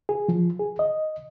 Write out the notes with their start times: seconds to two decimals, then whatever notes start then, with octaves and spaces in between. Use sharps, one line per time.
0.09 G#4
0.29 F3
0.59 G#4
0.79 D#5